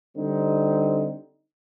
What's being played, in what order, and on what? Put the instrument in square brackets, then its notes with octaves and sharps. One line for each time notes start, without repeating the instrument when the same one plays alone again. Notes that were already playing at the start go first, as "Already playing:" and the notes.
[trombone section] D3 G3 C4 D#4